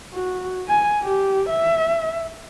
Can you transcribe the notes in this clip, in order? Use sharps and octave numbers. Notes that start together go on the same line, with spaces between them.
F#4
G#5
G4
E5